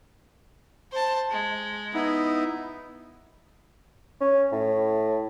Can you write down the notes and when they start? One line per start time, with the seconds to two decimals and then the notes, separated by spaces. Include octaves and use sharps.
0.91 C5 A5
1.30 G#3
1.94 B3 D#4 E4
4.21 C#4
4.52 A2